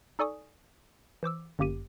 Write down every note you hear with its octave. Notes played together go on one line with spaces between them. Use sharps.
D#4 A4 D5 G#5 C#6 D#6
E3 C5 D6 E6
G1 F#2 A#3 G4 D6 D#7